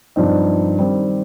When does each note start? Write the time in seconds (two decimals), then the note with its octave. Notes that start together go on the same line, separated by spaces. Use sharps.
0.16 G2 F3 C4 D#4
0.77 D#3 G3 C4